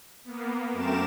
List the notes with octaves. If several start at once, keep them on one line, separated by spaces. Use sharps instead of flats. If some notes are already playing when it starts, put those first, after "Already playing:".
A#3 B3
F#2 A3 C4 A#4 D6 E7